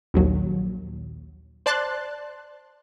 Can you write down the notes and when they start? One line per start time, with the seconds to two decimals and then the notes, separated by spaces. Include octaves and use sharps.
0.14 A#1 D#2 F#3
1.66 C5 D5 A5 C6 F#6 A6